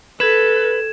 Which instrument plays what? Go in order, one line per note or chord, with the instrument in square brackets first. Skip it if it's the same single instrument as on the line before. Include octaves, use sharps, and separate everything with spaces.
[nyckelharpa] A4 [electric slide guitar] B4 [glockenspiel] G#6 E7